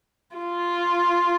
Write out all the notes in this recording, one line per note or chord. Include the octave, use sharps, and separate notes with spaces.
F4